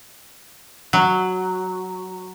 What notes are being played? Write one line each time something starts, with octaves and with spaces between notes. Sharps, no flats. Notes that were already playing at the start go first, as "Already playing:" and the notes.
F#3